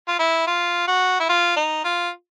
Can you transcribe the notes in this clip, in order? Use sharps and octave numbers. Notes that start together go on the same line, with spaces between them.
F4
E4
F4
F#4
E4
F4
D#4
F4